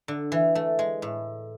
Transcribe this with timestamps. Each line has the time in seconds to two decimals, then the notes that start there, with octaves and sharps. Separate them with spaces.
0.08 D3
0.32 E3
0.55 A3
0.79 G#3
1.02 A2